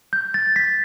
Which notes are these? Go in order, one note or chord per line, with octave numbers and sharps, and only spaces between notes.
G6
A6
B6